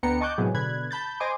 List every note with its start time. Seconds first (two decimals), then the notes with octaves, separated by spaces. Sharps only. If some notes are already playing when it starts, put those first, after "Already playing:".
0.03 D2 B3 D4 G5 A#5 C#7
0.21 D#5 A5 C#6 D6 F#6 G6
0.38 A2 C3 F#3 G#3 B3 G#4
0.54 B2 D3 B5 F#6 G#6
0.91 A5 B5 G6 A6
1.20 C5 D#5 G#5 C6 D6